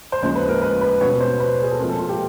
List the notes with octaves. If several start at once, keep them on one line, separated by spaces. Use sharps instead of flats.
C5
D#2 C#3 F3 G#3 C5
B4
A#4
B4
B4
B2 G3 B3 C#5
C5
B4
G#4
A4
A#2 F3 G#3 C4 A#4
A4
F4
G4